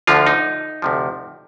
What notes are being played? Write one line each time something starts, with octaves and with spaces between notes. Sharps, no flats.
D2 D3 F3 F4
D#4
D2 C3 F3